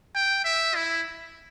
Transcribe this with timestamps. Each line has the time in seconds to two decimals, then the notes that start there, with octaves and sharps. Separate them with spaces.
0.15 G5
0.45 E5
0.75 E4